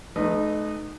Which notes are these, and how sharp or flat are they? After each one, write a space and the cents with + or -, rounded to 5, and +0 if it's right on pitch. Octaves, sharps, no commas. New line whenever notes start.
A3 -40 D#4 -20 B4 +0